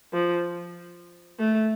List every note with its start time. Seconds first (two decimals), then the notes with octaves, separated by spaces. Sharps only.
0.13 F3
1.39 A3